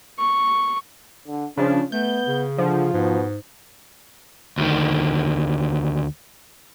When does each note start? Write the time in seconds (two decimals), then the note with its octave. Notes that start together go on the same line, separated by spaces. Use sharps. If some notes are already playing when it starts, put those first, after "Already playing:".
0.19 C#6
1.27 D3
1.57 C#3 F3 C#4 D4
1.92 A3 B3 G6
2.27 C#3
2.58 D3 F3
2.93 G#2 B2
4.58 D2 D#3